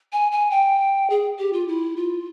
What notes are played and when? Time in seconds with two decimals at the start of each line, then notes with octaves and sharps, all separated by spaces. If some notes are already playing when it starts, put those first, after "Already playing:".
0.13 G#5
0.32 G#5
0.51 G5
1.10 G#4
1.39 G4
1.53 F4
1.68 E4
1.96 F4